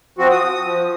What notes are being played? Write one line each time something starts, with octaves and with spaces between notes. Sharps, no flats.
F3 C4 F#4
D#6
F3